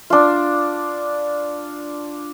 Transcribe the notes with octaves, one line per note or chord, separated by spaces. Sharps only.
D4 F4